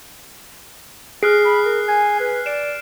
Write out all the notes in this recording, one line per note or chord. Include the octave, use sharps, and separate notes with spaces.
G#4 F6 F#6 C7
B5
A#4
G#5
B4
D5 D7 E7